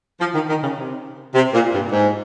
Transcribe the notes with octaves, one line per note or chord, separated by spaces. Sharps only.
F3
D#3
D#3
C#3
C3
C3
A#2
G2
G#2